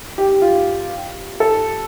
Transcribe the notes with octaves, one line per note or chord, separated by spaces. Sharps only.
G4
F4
A4